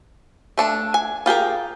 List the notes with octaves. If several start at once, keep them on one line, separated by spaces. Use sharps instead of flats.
A3 D4 A5
G#5
F4 G4 G#4 A#4